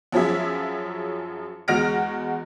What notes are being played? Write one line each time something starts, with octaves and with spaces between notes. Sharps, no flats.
F#2 F3 F#3 G#4 E5
E2 G#3 F#4 F6 A#6 D7